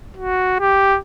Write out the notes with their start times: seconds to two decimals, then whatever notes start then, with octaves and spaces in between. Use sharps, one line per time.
0.17 F#4
0.60 G4